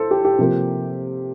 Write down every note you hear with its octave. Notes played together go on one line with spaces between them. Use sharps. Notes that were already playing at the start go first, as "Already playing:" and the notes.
Already playing: A2 A4 C5
G4
G4
C3 F3 A#3